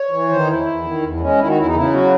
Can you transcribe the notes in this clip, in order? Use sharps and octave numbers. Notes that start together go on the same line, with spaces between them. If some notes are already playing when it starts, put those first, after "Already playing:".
Already playing: C#5
E3
D#3 C5
D#4
E2 E4
E2
D#3
E2
G#3 C#4
D#3 E4
F#4
E2 E4
D#4
C#3 E4
F#3 F#4